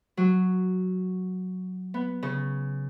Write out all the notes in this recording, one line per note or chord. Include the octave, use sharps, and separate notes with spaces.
F#3
B3
C#3